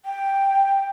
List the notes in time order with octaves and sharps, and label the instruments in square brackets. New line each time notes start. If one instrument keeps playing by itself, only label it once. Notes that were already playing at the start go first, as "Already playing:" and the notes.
[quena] G5